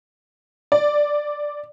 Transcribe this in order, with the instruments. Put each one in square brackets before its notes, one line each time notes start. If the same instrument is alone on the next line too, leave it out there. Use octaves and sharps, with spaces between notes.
[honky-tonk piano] D5